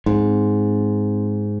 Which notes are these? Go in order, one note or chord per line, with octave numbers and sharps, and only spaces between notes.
G#2 C4